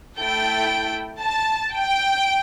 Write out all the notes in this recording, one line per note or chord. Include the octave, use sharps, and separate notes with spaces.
A3 E4 A4 G5
A5
G5